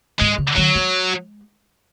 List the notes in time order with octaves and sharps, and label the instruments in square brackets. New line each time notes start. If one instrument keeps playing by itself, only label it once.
[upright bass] G#2 [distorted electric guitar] G#3
[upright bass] C#3
[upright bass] D#3 [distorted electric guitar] F#3
[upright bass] G#3